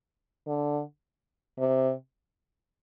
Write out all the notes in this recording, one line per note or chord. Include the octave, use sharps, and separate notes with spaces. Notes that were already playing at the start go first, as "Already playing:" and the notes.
D3
C3